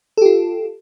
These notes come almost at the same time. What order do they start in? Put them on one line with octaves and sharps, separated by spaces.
A4 G4 F4